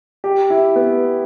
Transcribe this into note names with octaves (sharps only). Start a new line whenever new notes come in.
G4
E4
B3